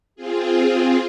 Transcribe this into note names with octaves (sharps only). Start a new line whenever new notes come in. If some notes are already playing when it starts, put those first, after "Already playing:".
C4 F4 G#4